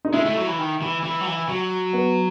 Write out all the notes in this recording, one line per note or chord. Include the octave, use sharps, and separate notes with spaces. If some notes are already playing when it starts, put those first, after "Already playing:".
D#4
G#3 E4
A3
F#3
E3
D#3
E3
E3
F#3
E3
F#3
B3